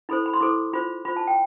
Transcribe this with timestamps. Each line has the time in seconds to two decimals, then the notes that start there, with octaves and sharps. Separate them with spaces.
0.09 E4 A4 C5 B5
0.26 B5
0.34 C6
0.41 E4 A4 C5 D6
0.73 F4 C5 B5
1.05 F4 C5 B5
1.16 A5
1.27 G5